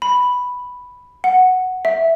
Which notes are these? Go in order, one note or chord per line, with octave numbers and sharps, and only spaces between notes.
B5
F#5
E5